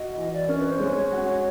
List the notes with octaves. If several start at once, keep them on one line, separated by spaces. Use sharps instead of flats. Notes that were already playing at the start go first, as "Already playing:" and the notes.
Already playing: F#4 D#5
E3
D5
C#4 A#4
B4
C5
G#3 C#5
F#4